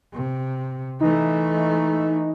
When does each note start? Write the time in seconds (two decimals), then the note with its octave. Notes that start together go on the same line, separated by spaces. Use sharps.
0.13 C3
1.01 E3 A3 D#4